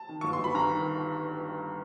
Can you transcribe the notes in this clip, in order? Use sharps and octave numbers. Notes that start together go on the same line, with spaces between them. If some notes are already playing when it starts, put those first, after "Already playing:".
Already playing: A5
D#3
G1 C#6
C6
G1
B5
G2 A#5
D#3